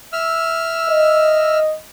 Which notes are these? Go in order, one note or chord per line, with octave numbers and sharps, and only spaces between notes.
E5 E6 F6
D#5